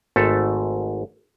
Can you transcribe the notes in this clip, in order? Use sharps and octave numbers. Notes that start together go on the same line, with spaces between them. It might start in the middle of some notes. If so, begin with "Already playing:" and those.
G#1 G#2 A3 A4